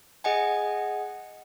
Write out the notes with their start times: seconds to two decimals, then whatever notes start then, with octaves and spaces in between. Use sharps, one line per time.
0.24 G#4 D#5 F#5 G#5